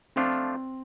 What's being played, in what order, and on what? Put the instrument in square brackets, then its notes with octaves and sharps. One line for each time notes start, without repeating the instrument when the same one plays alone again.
[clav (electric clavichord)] F3 A3 D4 F4 [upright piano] C4